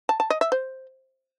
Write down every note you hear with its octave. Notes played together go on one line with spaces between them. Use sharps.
A5
A5
D#5
E5
C5